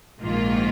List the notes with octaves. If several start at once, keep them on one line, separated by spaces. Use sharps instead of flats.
A#1 G#2 D#3 A#3 F4